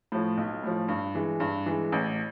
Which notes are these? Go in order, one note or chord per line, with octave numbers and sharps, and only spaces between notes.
A2 F3
B1
A2 F3
G2
E3 G#3
G2
E3 G#3
A1